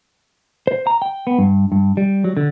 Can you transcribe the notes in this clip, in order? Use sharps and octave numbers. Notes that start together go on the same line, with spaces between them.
C5
A#5
G5
B3
G2
G2
G3
F#3
D3